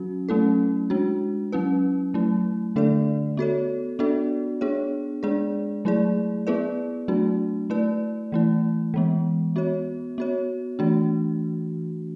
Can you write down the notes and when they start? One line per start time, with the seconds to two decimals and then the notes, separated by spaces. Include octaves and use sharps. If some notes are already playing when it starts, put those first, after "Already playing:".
Already playing: F#3 C#4 F#4
0.29 F#3 A3 C#4 E4 A4
0.90 G#3 D4 F#4
1.52 F#3 C#4 E4 B4
2.14 F#3 A3 E4
2.76 D3 A3 D4 A4 D5
3.37 B3 F#4 A4 C#5
3.99 B3 D4 F#4 A4 D5
4.61 B3 D4 G#4 C#5
5.23 G#3 D4 G#4 D5
5.85 F#3 A3 E4 G#4 D5
6.47 B3 E4 G#4 B4 D5
7.08 F#3 A3 D4 F#4
7.70 A3 E4 B4 D5
8.32 E3 A3 E4
8.94 E3 G#3 B3
9.56 B3 F#4 C#5
10.18 B3 F#4 C#5
10.79 E3 A3 D4 F#4